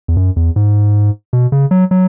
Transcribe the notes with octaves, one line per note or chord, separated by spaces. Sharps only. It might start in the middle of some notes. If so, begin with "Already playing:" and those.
E2
F#2
E2
G#2
B2
C#3
F#3
F#3